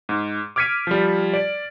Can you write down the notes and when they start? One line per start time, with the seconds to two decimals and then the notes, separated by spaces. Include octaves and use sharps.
0.09 G#2
0.56 D6 F6 G#6 B6 C#7 D#7
0.87 F3 G3
1.33 D5